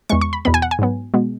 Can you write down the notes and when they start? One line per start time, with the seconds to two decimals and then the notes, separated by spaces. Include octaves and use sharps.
0.09 E2 E3 G#3 C#6
0.21 C#6
0.33 B5
0.45 E2 B2 B3 B5
0.54 G#5
0.62 F#5
0.71 G#5
0.79 G#2 F#3 B3
1.14 B2 G#3 B3